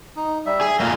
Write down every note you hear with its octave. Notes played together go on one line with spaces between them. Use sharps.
D#4
G3 E5
G#4
A3 A#3 F4 A#4